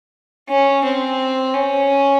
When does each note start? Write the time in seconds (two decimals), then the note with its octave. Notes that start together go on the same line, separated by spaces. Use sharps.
0.49 C#4
0.85 C4
1.54 C#4